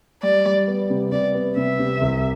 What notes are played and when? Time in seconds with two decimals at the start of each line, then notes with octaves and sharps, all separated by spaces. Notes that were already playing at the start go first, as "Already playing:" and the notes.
0.23 G3 D5
0.45 G3
0.68 B3
0.90 C3
1.12 C3 D5
1.35 B3
1.57 C3 E5
1.79 C3
2.01 C2